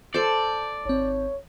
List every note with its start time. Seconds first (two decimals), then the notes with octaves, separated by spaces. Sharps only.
0.14 A4 C5 D5
0.85 G#1 C4 C#5